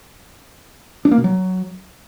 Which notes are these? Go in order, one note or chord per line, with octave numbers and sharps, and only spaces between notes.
D4
A#3
B2
F#3